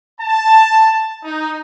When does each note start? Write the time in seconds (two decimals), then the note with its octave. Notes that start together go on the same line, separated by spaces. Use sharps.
0.19 A5
1.24 D#4